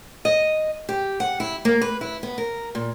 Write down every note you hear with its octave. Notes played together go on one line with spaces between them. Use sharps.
D#5
G4
F#5
E4
A#3
B4
E4
B3
A#4
A#2